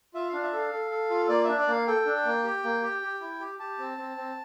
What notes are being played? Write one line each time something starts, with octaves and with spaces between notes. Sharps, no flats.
F4 E5
D4 F5
E5
A4 F5
A4
A4
F4
A#3 D5
D4 E5
D5
A#3 F5
A4 G5
D4
A#3
G4
A#3
G4
G4
E4
G4
G4 A5
C4
C4
C4